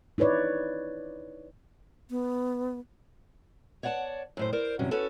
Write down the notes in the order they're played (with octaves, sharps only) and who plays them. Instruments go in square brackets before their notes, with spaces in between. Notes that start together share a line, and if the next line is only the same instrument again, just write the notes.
[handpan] D#4 E4 B4 C#5 D5
[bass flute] B3
[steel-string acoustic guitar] C#5 D5 F#5 G5 A5
F#2 A2 C5
A#4 C5 D5
G2 C3 E3 F#3 C#4
C#4 F#4 A4 B4